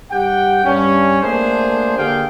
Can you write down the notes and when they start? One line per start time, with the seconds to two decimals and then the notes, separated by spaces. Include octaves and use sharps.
0.11 G2 G4 F#5 G5
0.65 G2 C#4
1.22 A3 A#3 D4 G#4 C5
1.98 D3 A#3 G4 G#4 F5 G5